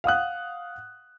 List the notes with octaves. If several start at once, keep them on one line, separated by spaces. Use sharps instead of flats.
F5 F#5 D#6 F#6